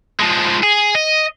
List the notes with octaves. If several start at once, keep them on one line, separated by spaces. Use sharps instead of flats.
F3 G#3
G#4
D#5